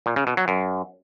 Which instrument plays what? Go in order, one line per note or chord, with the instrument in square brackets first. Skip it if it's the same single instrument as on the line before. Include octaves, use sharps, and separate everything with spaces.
[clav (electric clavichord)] A#2
C#3
B2
F#3
F#2